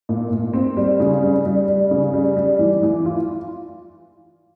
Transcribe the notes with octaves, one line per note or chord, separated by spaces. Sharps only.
A#2
A#2
C4
G3
C#3
G3
G3
G3
C#3
G3
G3
E3
E3
F4